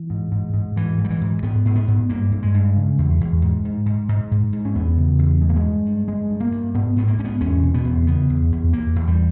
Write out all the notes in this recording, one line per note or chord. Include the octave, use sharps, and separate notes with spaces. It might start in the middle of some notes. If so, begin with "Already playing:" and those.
Already playing: E3
G#2
G#2
G#2
G#2 E3
G#2
G3
E3
G#2
G#2 B3
G#2
B3
G#2
G2 A#3
G2
G#3
G2
C#3
E2
E2
G#2
G#2
G#2
G#2
G#2
G#2
C#4
E2 B3
C#3
E2
G2 G#3
A#3
G#3
G2
G2
G2 G#3
G2
A#3
G2
G#2 B3
G#2 B3
A#3
G#2 C#4
B3
E2 C#4
B2
B3
E2
C#3 B3
E2
E2
E2 A#3
E2
G3